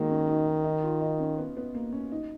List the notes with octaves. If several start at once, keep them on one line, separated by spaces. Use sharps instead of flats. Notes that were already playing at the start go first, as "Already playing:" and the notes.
Already playing: D#3 F#3 G#3 A#3
C#4
D#4
D#4
D#4
F4
D#4
C#4
B3
B3
A#3
C#4
D#4